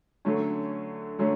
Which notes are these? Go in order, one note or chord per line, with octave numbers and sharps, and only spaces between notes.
D3 F#3 A3 C#4
D3 F#3 A3 C#4